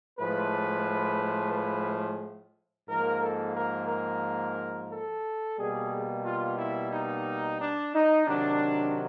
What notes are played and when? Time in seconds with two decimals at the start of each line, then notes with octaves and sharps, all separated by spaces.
0.18 A2 F3 G#3 B4
1.54 B4
2.88 G#2 F3 A#3 A#4
3.22 A4
3.55 A#4
3.88 A#4
4.89 A4
5.57 B2 G3 A#3 G#4
6.24 F4
6.58 E4
6.92 D#4
7.60 D4
7.94 D#4
8.27 C3 D#3 F#3 D4